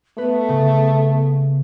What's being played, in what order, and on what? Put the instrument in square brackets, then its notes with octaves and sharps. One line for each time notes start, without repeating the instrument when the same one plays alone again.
[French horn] A3 [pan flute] B3 [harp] B4
[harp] C#3